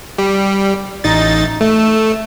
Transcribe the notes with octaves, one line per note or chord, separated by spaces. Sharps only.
G3
A1 D#4 A6
A3